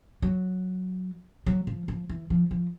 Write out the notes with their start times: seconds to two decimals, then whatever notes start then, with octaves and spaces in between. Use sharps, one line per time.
0.22 F#3
1.46 F#3
1.67 F3
1.88 F3
2.09 E3
2.30 F3
2.51 F3